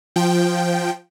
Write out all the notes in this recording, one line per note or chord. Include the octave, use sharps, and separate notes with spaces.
F3 G5